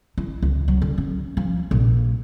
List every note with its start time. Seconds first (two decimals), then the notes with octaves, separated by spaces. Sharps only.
0.18 E4
0.42 C#2
0.68 F#3
0.82 D3
0.98 C#4
1.37 F3
1.71 A#1